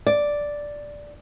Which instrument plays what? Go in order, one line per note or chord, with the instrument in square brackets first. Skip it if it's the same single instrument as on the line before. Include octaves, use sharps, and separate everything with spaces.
[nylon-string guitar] D5